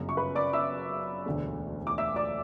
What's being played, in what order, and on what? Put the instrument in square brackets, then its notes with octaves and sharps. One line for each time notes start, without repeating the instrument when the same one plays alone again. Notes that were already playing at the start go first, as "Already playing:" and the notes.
Already playing: [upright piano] G1 F#2 C#3 F#3
C#6
B4 B5
D5 D6
E5 E6
E1 D2 D3 A3
D6
E5 E6
D5 D6